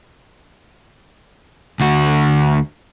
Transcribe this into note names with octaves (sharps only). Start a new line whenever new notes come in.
D2 F#4